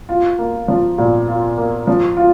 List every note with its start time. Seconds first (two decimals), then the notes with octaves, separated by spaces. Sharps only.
0.09 F4
0.39 A#3
0.68 F3
0.98 A#2
1.28 F4
1.58 A#3
1.87 F3
2.17 F4